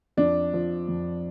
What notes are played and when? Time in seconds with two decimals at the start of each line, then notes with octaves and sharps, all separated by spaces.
0.17 F2 D4
0.54 F3
0.88 F2